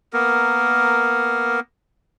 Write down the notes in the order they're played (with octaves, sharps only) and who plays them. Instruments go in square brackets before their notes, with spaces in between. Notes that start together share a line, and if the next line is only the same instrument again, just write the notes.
[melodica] A#3 B3 A#4